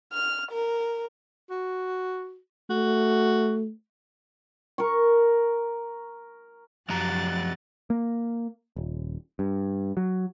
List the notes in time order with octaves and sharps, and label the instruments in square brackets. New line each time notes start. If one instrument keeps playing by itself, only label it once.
[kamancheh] F6
A#4
[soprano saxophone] F#4
[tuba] A3 [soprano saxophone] F#4
[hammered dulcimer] A#4 C#6
[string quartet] F#2 F#6 A6 [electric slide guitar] F3 G4 A#5
[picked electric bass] A#3
D#1
G2
F#3